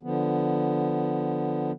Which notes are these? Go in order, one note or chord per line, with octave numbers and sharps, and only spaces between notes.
D3 F3 B3